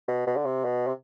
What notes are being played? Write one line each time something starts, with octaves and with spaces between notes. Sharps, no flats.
B2
B2
D3
C3
B2
C3